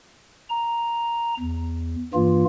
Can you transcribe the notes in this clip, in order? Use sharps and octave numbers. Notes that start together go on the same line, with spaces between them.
A#5
E2
G2 E3 A#3 F4